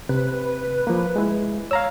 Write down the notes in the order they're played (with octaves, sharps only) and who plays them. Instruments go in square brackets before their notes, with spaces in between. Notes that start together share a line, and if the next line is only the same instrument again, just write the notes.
[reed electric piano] C3 [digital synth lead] B4
[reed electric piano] F3 A#3
G#3 E4
[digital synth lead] C#5 [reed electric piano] F5 A#5 E6